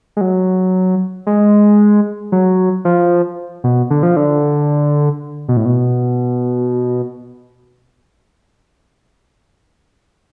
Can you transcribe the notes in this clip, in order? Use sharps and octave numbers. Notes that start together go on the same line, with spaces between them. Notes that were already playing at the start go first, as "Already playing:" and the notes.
G#3
F#3
G#3
F#3
F3
B2
D3
F3
D3
B2
A2
B2